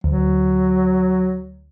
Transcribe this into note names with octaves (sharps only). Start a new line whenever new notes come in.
D2 F#3